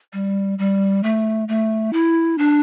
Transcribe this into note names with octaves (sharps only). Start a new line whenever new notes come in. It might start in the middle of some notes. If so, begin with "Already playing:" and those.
G3
G3
A3
A3
E4
D4